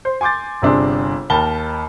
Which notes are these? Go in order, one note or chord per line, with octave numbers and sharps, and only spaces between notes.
C5
G#5 C6 D6 G6 A6
G1 C3 D4 G#4 C6
D#2 D#3 A#4 A5 B5 G7